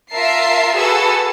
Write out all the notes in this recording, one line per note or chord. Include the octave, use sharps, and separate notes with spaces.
F4 A#4 E5 A5 C7
F#4 G#4 A4 B4 E6